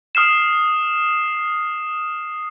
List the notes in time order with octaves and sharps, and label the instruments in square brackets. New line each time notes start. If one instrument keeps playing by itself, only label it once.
[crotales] D#6 F6 C7 E7